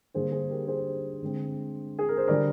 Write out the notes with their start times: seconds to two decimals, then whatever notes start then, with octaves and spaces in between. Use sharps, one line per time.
0.14 D3 G3 A#3 D4 G#4 C5
0.32 G#4 C5
0.51 G4 A#4
0.68 G#4 C5
1.22 D3 G#3 C4
1.99 G#4
2.09 A#4
2.17 C5
2.28 D3 G3 A#4 D5